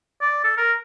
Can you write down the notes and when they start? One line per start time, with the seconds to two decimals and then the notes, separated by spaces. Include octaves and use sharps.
0.21 D5
0.44 A4
0.57 A#4